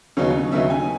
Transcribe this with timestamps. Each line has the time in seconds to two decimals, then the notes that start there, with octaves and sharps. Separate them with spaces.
0.17 D#2 C#3 F#3 B3 D#4 C#5
0.52 D#2 C#3 F#3 B3 D#4 E5
0.70 G#5